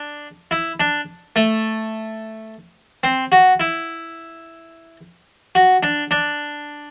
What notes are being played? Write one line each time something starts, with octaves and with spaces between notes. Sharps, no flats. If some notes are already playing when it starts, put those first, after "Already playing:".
Already playing: D4
E4
D4
A3
C4
F#4
E4
F#4
D4
D4